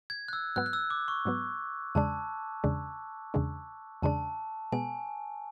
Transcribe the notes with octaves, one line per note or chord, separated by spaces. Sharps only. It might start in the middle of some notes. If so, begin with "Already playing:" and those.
G#6
F#6
E6
G#2 F#3 B3 F#6
F#6
E6
D6
C#6
G#2 F#3 B3
E2 C#3 G#3 D4 A5
E2 C#3 G#3 D4
E2 C#3 G#3 D4
E2 C#3 G#3 D4 A5
B2 G#3 B3 G#5